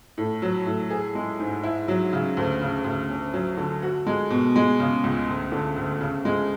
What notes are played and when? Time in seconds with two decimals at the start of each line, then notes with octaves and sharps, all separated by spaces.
0.18 A2
0.42 F#3
0.66 A2
0.90 G#4
1.15 G#3
1.39 G#2
1.63 E4
1.88 F#3
2.13 C#3
2.37 D2
2.61 C#3
2.84 D2
3.10 C#4
3.33 F#3
3.57 D3
3.82 F#4
4.07 G#3
4.30 B2
4.56 G#3
4.80 C#3
5.04 C#2
5.28 D2
5.52 D3
5.76 D2
6.01 C#3
6.25 G#3